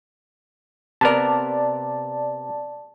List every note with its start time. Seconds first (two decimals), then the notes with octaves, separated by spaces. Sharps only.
1.01 C3 B3 A#4 D5 A5